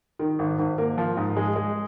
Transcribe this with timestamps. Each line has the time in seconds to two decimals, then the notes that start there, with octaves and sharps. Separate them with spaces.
0.19 D#3
0.39 G#1
0.59 G#1
0.78 A#3
0.98 F3
1.17 G#2
1.37 G#3
1.56 G#3